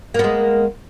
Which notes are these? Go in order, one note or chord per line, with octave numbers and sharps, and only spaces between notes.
G#3 A#3 B3